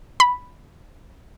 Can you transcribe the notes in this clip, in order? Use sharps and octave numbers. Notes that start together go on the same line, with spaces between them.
B5